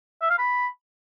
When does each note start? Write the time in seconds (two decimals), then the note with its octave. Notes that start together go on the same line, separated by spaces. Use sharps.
0.22 E5
0.30 F5
0.38 B5